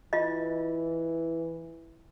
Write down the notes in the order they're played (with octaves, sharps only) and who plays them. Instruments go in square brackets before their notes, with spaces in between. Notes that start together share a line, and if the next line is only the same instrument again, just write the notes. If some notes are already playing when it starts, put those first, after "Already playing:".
[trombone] E3 [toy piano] F4 D#5